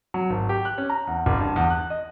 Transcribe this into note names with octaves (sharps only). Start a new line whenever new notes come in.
F#3
G#1
G4
F#6
C#4
A#5
E2
F#1
G2
E2
F#6
D#5